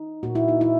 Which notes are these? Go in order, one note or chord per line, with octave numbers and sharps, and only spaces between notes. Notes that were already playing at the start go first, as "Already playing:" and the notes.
Already playing: D#4
A#2 A#3 F#4
E4
D#4
E4